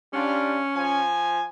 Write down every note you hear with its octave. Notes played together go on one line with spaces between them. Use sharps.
G3 C#4 D4 F4
F3 G#5